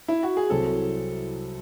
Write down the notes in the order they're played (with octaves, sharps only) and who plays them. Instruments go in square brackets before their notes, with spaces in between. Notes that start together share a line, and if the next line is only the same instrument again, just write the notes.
[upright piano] E4
F#4
G#4
[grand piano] C2 C3 F#3 C4 E4 [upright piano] A4